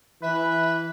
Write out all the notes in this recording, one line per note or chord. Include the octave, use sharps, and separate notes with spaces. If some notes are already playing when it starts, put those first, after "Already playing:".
E3 B4 E5